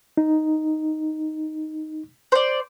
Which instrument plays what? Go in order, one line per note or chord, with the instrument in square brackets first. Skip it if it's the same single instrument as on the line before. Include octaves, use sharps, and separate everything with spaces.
[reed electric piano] D#4
[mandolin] C5 D5